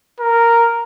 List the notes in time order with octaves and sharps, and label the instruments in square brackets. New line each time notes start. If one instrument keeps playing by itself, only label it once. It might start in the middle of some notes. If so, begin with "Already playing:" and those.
[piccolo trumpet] A#4